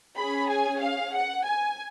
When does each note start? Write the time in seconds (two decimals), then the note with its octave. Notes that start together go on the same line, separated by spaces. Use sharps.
0.16 C#4 G#4 B5
0.49 G#5
0.80 F5
1.14 F#5
1.45 G#5